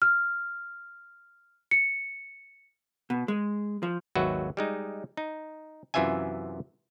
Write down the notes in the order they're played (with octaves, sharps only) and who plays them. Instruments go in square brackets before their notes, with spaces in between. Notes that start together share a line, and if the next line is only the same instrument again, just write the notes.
[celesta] F6
C#7
[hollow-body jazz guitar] B2
G#3
F3
[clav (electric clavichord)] G#1 D#2 F#3 F#4 B4 E5
G3 G#3 D#4
D#4
F#2 C3 E3 F4 E5 G#5